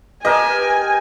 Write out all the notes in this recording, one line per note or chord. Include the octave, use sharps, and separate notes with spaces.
G4 A#4 B4 D#5 G#5 A5